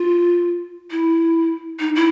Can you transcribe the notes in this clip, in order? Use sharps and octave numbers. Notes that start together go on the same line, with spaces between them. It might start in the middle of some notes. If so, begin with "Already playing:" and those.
Already playing: F4
E4
D#4
E4